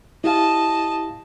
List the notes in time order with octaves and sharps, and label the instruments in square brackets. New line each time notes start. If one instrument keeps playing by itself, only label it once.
[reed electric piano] E4 G4 F5 [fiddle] D#5 A5